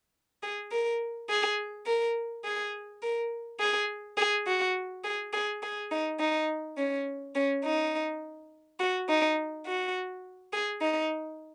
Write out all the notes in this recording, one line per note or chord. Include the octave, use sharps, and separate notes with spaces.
G#4
A#4
G#4
A#4
G#4
A#4
G#4
G#4
F#4
G#4
G#4
G#4
D#4
D#4
C#4
C#4
D#4
F#4
D#4
F#4
G#4
D#4